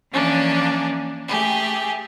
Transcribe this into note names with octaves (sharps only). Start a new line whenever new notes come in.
E3 F3 A#3 C#4 D4
A3 G4 G#4